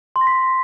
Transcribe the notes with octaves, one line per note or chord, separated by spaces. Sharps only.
C6
A#6
B6